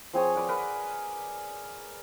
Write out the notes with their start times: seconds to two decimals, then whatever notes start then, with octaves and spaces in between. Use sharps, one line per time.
0.13 F3 C4 G#4 C#5
0.36 B4 D5 F#5
0.48 A#4 B4